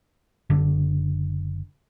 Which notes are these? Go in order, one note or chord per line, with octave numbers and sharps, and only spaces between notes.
F#1 D3